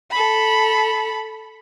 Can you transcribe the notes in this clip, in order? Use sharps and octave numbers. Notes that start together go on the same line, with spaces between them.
A4 B5